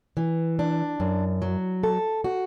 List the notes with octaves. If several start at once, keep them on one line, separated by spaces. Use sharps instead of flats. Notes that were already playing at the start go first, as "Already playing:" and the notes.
E3
D4
F#2
F#3
A4
F#4